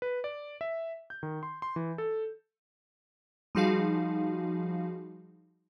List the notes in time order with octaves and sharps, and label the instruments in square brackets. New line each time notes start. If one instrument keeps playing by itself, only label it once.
[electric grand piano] B4
D5
E5
G6
D#3
C6
C6
E3
A4
[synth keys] F3 G3 D#4 F#4 G#4 F5